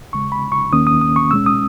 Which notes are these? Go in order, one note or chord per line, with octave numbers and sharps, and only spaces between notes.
D#2 C#3 G#3 C#6
B5
C#6
D#2 D#3 A#3 C#4 D#6
D#6
D#6
C#6
B2 G#3 C#4 E6
D#6